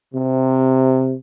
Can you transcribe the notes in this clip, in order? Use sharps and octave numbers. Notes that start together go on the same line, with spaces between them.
C3